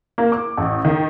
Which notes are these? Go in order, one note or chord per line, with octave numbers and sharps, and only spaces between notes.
A#3
D6
A1
D#3